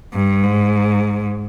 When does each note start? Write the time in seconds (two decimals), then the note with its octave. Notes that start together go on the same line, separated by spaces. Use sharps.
0.13 G2
0.43 G#2